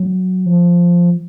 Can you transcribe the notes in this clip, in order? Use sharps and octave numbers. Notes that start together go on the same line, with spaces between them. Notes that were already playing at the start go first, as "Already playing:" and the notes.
Already playing: F#3
F3